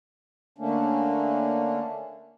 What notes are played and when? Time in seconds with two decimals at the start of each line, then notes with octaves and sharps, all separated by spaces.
0.58 D3 A3 A#3 C#4 D4